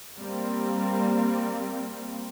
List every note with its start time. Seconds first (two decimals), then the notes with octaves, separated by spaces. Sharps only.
0.17 G3 A#3 C4